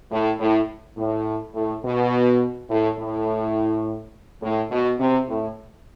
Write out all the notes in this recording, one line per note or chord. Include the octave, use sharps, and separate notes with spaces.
A2
A2
A2
A2
B2
A2
A2
A2
B2
C3
A2